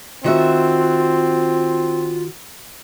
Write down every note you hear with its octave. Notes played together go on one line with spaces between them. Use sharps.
D#3 C4 F4 F#4 E5